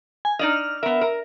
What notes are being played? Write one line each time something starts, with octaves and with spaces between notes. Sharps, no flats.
G#5
D#4 D5 D#5 F6
F6
B3 A#4 E5
A#4